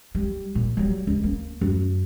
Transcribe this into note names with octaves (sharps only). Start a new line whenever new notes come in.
G3
A#2
F#3 G3
C#2
A#3
F#2